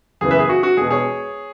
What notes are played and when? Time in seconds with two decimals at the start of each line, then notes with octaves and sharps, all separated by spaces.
0.21 F#1 E2 C#3 E3 G#4
0.31 B4 E5
0.39 G#4
0.49 F#4
0.63 F#4
0.77 E1 E2 B2 G#4
0.91 G#4 C#5